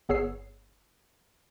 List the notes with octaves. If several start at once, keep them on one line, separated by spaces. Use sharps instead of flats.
G1 B3 G#4 C#5 E6 C7